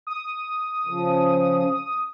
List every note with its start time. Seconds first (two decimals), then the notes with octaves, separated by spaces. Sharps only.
0.07 D#6
0.86 C#3 F3